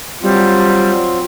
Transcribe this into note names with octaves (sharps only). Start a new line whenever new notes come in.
F#3 G3 C4 F4